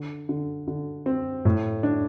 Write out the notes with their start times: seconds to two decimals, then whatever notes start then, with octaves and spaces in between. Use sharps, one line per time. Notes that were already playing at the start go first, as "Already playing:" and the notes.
Already playing: D3
0.29 D3
0.68 D3
1.06 C4
1.45 A2
1.83 D4